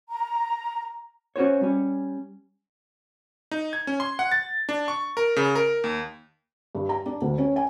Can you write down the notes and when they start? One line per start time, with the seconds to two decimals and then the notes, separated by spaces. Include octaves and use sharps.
0.10 A#5
1.36 C#4 F#4 C5 C#5
1.61 G3 C#4
3.51 D#4
3.73 G#6
3.87 C#4
4.00 C6
4.19 F#5
4.32 A6
4.69 D4
4.88 C#6
5.17 A#4
5.36 C#3
5.55 A#4
5.84 D#2
6.75 G2
6.89 A#5
7.06 D4
7.21 D2
7.38 C#4
7.56 G#5